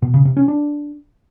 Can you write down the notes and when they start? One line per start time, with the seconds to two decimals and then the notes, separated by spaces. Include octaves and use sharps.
0.02 B2
0.14 C#3
0.25 C3
0.37 C#4
0.48 D4